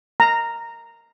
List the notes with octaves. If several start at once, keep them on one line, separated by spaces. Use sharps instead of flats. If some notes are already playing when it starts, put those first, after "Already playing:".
A#5